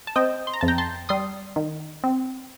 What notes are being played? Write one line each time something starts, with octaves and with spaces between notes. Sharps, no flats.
A5
C4 D#5 G5
C6
A#5
F2 A5
G5 A#5
A5 C6
G3 C6 D#6
D#3
C4